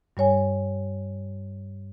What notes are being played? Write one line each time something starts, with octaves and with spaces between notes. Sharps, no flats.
G2 G3 C#5 G#5